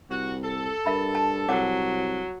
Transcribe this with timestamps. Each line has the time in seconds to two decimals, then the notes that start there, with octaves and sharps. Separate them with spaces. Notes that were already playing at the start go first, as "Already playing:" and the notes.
0.10 C2 F#4
0.43 A4
0.86 G2 A#4 E5 B5
1.15 A5
1.48 C2 F#3 C#5 F#5 D6